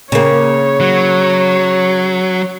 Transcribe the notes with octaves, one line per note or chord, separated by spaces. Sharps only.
C#3 A#3 C#5
F#3